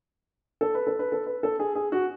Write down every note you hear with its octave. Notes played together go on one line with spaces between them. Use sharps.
A4
B4
A4
B4
A4
B4
A4
G#4
G#4
F#4